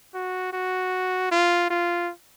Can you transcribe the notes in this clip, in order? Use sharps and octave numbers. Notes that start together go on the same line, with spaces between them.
F#4
F#4
F4
F4